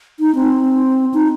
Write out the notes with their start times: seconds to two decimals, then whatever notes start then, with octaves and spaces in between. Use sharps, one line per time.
0.20 D#4
0.35 C4
1.14 D#4